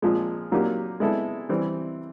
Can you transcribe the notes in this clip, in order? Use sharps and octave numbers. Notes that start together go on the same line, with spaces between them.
A#2 F3 G#3
A#2 F#3 A#3 D#4 G4
G#3 B3 E4 A4
E3 G3 C4